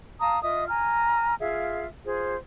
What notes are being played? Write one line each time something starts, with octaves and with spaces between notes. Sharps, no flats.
F5 A5 A#5 D#6
F4 D#5 E5 D#6
G#5 A#5 F6
F4 G#4 E5 F5
F4 G#4 C5